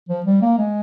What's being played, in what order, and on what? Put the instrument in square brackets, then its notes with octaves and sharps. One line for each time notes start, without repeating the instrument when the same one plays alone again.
[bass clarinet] F3
G3
A#3
G#3